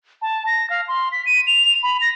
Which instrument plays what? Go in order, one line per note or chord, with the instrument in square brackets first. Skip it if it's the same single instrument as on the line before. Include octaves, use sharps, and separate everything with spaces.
[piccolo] A5
A#6
F5
C6
B6
D#7
F7
B5
A#6